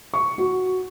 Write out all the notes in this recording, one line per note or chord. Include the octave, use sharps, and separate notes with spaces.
C#6
F#4